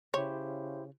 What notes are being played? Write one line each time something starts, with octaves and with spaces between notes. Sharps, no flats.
C#3 E4 G4 C5 C#5